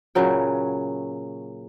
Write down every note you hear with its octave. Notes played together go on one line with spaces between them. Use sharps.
A#2 C#3 F#3 G5